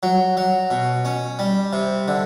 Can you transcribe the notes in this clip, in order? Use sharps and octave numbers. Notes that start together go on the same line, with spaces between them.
F#3
F#3
B2
C#4
G3
C3
D3